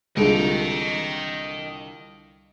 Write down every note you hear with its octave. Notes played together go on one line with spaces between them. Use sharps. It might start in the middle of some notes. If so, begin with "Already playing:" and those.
C2 D3 G#3 F4 A4 D#5 G5